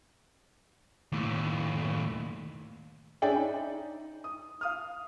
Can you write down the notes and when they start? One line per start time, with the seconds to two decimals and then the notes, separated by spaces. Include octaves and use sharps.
1.12 D#2 A2
3.22 C#4 D4 G#4 D5 E5 G5
3.36 D#4
4.24 D#6
4.61 F5 D#6 F6